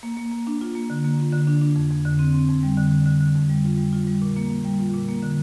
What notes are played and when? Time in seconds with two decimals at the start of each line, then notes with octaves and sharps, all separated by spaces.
0.03 A#3
0.17 A#3
0.32 A#3
0.47 D4
0.61 F4
0.75 A#3
0.90 D3
1.04 A#3
1.19 F4
1.32 D3
1.47 D4
1.62 D4
1.76 F2
1.91 F2
2.05 D3
2.19 C4
2.34 C4
2.49 F2
2.63 G3
2.77 D3
2.92 D3
3.06 D3
3.21 D3
3.35 F2
3.50 G3
3.64 F4
3.78 G3
3.93 F4
4.07 G3
4.22 A#2
4.37 A#3
4.50 A#3
4.65 G3
4.79 F4
4.94 A#2
5.08 A#3
5.22 D3